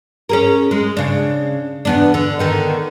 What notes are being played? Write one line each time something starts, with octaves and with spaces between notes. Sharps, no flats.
C#4 G#4 A#4
G#3
C#3 D4
E2 B3 D4
D3
D3 D#3 B3